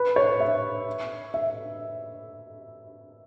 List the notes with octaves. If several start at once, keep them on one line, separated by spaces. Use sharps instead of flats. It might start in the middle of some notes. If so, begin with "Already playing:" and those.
Already playing: B4
C#5
E5
E5